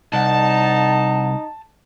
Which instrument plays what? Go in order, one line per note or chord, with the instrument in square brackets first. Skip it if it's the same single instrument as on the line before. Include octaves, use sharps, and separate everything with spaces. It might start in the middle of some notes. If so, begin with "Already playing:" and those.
[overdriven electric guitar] C2 [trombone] D#4 [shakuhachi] F#5 [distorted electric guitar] A5